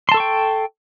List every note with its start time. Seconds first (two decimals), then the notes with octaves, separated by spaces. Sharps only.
0.09 C6
0.12 A5
0.14 A4
0.17 C#6
0.20 G5